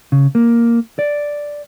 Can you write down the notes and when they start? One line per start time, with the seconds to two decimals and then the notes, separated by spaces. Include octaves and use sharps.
0.12 C#3
0.35 A#3
0.99 D5